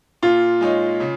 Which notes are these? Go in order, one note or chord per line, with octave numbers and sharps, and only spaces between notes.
A#2 F4
G#3 D#4 C#5
C#3